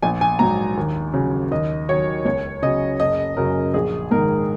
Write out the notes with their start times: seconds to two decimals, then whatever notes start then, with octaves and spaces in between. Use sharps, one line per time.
0.03 A#1 G#5
0.21 G#5
0.39 G#2 F#3 A#5
0.77 D#2
1.14 C#3 F#3
1.51 D#2 D#5
1.89 D#3 F#3 C#5
2.25 C#2 C#5
2.62 C#3 F#3 D#5
3.00 F#1 D#5
3.37 F#2 C#3 F#3 A#4
3.74 A#1 G#4
4.11 G#2 D#3 A#4